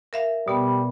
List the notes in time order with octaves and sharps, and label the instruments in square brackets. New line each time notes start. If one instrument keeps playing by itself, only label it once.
[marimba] A#4 E5 F5
[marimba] B2 B3 [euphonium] G3